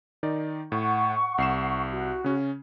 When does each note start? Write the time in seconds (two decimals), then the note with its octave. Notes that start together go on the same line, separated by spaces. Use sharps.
0.23 D#3 D#4 D5
0.72 A2 F#5 C#6
1.38 C2 C7 E7
1.92 F#4
2.24 C#3 C#4